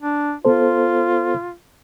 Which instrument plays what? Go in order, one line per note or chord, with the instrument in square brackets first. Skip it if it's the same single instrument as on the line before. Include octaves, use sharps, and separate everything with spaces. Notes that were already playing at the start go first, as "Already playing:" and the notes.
[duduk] D4
[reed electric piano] B3 A4 C5 [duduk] F4